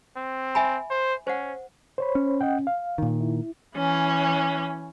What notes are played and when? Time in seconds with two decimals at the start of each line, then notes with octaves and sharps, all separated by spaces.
0.16 C4
0.55 E5 G#5 B5
0.90 C5
1.27 C#4 C5 F#5
1.98 C5 C#5 B5
2.15 C#4
2.41 D#5 F#5 G5
2.67 F5
2.98 A#2 D#3
3.21 E4
3.76 E3 C#4